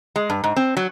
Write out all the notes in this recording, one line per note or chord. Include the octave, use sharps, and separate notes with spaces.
G#3
G2
G#2
C4
F#3